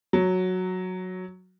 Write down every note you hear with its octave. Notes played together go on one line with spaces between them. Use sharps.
F#3